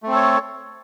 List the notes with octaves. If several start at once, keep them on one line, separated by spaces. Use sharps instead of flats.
A3 C4 A4 C#5